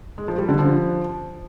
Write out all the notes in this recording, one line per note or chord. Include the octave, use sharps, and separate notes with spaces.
G#3
F3
G3
D3
F3